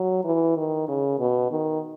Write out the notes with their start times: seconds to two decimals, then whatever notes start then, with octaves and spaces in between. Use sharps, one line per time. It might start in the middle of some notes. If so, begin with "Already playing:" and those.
Already playing: F#3
0.24 E3
0.57 D#3
0.88 C#3
1.19 B2
1.51 D#3